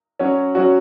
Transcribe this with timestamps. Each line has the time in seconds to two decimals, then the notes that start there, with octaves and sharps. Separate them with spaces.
0.19 F#3 C#4 F#4
0.55 F#3 C#4 F#4